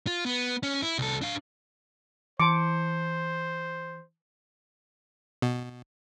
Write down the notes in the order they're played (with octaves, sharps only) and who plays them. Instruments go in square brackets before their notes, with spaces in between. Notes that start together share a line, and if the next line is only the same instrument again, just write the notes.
[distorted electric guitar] F4
B3
C#4
E4
C2 A4
D4 F5
[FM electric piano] E3 [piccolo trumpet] C5 [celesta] A5 C6 C#7 [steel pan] D6
[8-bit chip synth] B2